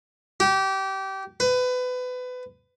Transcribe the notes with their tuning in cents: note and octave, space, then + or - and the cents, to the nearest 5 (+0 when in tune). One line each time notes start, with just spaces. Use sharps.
G4 -25
B4 +25